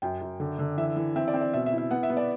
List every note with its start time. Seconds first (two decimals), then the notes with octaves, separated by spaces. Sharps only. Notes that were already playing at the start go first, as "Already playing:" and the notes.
0.02 F#2 G5
0.21 F#2
0.40 D3
0.59 D3
0.77 E3 E5
0.97 E3
1.16 C4 E5
1.28 D5
1.34 C4
1.41 D5
1.53 B2 E5
1.66 E5
1.73 E4
1.78 E5
1.90 B3 F#5
2.03 E5
2.10 B3
2.17 D5